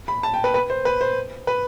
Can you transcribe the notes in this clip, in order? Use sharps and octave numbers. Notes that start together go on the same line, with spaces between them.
B5
A5
G5
B4
B4
C5
B4
C5
B4